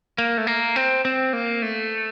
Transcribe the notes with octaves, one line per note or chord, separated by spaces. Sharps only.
A#3
A3
A#3
C4
C4
A#3
A3